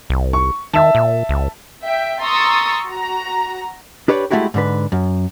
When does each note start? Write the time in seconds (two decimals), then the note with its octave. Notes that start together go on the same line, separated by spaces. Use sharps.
0.10 C2
0.33 C#6
0.73 D#3 E5 A5
0.95 A#2
1.29 C#2
1.83 E5 G5
2.22 A#5 C6 C#6 D#6 E6 A6
2.85 F#4 A#5
4.08 D4 G4 B4 C#5 D5
4.31 G#3 A3 C4 E4 F#4 G4
4.54 G#2 D3 B4
4.92 F#2